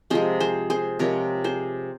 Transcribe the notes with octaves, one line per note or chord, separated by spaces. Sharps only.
C3 F3 G#3 G#4 C5
G#4 C5
G#4 C5
C3 F3 G#3 A#4 C#5
G#4 C5